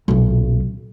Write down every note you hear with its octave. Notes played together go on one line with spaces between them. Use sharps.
D#1 B1